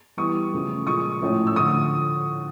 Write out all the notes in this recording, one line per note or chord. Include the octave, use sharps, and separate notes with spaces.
E3 G3 B3 C#6 D#6
C#3 F3 A3
A#2 F3 G#3 C#6 D#6
A2 F3 A3 C#4
E6
D3 F3 A3 C#6 D#6